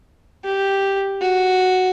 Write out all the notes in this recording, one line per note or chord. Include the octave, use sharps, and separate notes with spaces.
G4
F#4